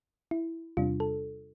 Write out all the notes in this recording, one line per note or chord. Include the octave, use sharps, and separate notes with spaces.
E4
E2 C3 G3 D4 F4
A4